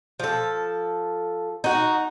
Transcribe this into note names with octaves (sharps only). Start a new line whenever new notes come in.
F3 A4
D#4 F#4